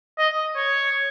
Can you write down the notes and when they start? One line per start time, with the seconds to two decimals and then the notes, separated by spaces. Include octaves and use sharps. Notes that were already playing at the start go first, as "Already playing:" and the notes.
0.18 D#5
0.56 C#5